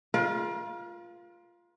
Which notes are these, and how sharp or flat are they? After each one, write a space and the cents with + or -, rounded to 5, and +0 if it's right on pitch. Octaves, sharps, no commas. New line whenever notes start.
F4 +0 A#4 +45